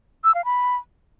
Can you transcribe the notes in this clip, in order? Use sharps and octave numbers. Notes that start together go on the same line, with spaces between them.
E6
F5
B5